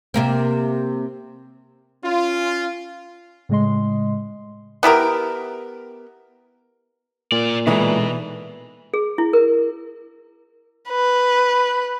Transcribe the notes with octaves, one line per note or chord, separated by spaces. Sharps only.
C3 A#3 C4
C#4 F4
A2 C#3 G#3 D#5 C6
B3 E4 G4 A#4
A#2 A#3 D5
B2 E3 G#3 A3 D#4
G#4
E4
A#4
B4